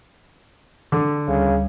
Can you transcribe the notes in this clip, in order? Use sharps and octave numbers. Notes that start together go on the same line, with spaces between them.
D3
D2 C#3 G3